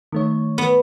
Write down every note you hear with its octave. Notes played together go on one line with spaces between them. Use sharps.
D#3 A3 C#5
B3